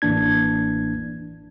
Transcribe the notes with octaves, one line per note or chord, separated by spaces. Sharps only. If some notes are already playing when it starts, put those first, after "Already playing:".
A1 E3 A#3 D4 G#6